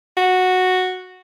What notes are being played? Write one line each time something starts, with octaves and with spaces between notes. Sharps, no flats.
F#4